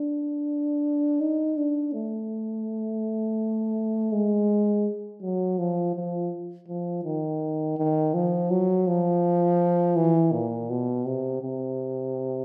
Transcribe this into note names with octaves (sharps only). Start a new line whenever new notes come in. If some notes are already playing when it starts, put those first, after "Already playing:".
Already playing: D4
D#4
D4
A3
G#3
F#3
F3
F3
F3
D#3
D#3
F3
F#3
F3
E3
A#2
B2
C3
C3